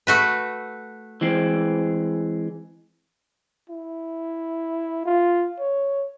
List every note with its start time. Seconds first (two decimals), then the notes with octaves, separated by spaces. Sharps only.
0.07 A3 F#4 B4
1.21 E3 G#3 C4
3.70 E4
5.06 F4
5.59 C#5